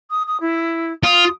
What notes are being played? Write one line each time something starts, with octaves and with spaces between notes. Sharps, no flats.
D#6
D#6
E4
F4 D#6